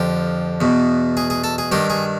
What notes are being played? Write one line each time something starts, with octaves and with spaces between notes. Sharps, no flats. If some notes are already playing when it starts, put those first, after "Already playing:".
Already playing: F2 D3 F3 G4
E2 B2
G#4
G#4
A4
G#4
G2 D#3 G4
G#4